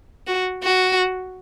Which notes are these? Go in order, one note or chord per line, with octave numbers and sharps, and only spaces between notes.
F#4
F#4